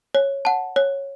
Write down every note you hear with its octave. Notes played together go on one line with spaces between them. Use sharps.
C#5
F#5 A5
C#5